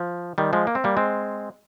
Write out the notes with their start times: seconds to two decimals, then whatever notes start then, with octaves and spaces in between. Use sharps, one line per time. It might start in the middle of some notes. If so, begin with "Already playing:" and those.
Already playing: F3
0.38 D#3 G3
0.53 F3 G#3
0.67 A#3
0.75 C4
0.84 G3 A#3
0.97 G#3 C4